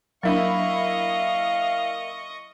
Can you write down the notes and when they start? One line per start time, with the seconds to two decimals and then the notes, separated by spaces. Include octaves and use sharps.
0.23 F#3 A#3 D4 E4 D#5 F5 B5 C#6